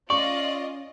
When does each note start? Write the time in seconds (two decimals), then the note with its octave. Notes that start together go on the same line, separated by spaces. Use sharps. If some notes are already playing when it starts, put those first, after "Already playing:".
0.10 C#4 F4 D5 D#5 C#6